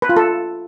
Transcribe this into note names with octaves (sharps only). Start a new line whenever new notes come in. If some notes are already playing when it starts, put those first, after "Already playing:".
B4
F4
A4